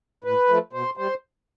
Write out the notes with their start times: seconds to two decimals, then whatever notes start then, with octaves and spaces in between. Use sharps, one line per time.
0.24 A2 B4
0.48 F3 A3
0.73 B2 C5
0.97 G3 C5